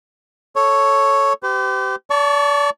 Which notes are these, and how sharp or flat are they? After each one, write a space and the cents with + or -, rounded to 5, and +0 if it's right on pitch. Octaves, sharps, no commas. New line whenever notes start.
A4 +0 C#5 +0
G4 -20 C5 -45
D5 -35 A5 +0 C#6 +15